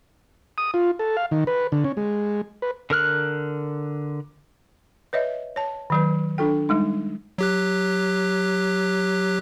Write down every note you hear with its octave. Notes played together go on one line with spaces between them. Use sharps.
D#6
F4
A4
F5
D#3
B4
D3
C#4
G#3
B4
D3 A#4 F6 F#6
B4 C#5 D#5 E5
C#5 A5
D#3 F#3 B4
D4 F4 A4 G5
G3 G#3 D#4
F#3 G4 F#6